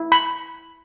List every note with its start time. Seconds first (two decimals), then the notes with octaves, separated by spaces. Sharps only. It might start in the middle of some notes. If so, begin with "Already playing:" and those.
Already playing: E4
0.12 B5